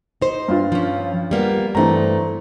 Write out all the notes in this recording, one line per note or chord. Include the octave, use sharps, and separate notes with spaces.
D#4 C5
G2 F4
F3 C#4
G3 A#3 B3
G2 E3 A3 C4 A#5